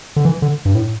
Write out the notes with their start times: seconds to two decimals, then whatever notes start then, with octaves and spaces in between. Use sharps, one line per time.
0.16 D3
0.25 E3
0.42 D3
0.65 G2
0.75 A2